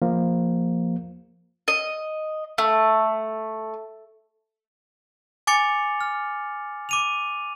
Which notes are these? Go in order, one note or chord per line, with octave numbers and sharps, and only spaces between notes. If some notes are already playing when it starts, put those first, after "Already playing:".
F3 A#3
D#5
A3
G#5 D6 A6 C#7 F7 G7
F6
D6 D#7 F7